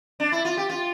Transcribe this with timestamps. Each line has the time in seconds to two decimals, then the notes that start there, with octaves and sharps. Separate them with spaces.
0.20 D4
0.32 E4
0.45 F4
0.57 G4
0.70 F4